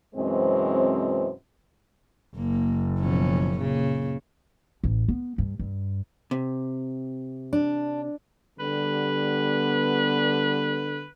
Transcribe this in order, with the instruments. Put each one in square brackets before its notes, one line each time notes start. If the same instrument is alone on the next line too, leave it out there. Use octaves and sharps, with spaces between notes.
[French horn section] F#2 B2 E3 G#3 C4
[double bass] F#1 [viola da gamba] A#3
[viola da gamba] B2 F3 C#4
A#2 C#3
[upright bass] A1
B3
G2
G2
[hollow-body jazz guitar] C3
[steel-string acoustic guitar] D4
[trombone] D3 [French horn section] G3 B3 [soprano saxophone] B4